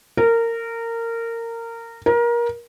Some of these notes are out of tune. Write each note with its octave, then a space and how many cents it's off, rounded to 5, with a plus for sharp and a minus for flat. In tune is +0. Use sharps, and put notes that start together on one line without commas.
A#4 -20
A#4 +25